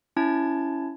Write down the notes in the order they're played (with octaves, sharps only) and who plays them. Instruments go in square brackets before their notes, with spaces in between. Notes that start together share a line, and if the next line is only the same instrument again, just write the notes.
[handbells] C#4 E4 A5 G#6